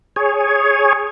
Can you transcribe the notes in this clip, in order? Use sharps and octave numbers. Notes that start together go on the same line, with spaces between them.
G#4 C#5